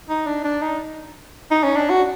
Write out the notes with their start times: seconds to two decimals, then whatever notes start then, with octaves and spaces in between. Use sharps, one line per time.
0.09 D#4
0.27 D4
0.44 D4
0.62 D#4
1.51 D#4
1.64 C#4
1.76 D4
1.90 F#4